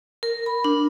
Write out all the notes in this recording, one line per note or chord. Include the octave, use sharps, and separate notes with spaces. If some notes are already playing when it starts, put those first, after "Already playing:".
A#4
B5
D4